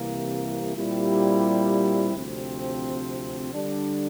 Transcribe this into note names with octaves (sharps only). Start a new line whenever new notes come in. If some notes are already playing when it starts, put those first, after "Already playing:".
Already playing: C2 C3 E3 A#3
A#2 G3 C4 E4 G4
D2 C3 F3 C4
D3 G3 D4